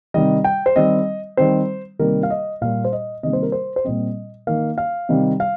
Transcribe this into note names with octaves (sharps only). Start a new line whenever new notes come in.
C3 D#3 G3 D#5
G5
C5
D#3 G3 C4 D#5
D#3 G3 C4 C5
C3 D#3 G3 A#3 A#4
F5
D#5
A#2 G3 A#3 F5
C5
D#5
C3 D#3 G3 A#3 D#5
C5
A#4
C5
C5
A#2 G3 C4 D#5
D#3 A#3 F5
F5
C3 D#3 G3 C4
F5